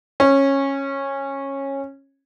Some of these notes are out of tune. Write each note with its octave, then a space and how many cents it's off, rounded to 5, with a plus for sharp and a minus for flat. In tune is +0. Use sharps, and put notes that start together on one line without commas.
C#4 -15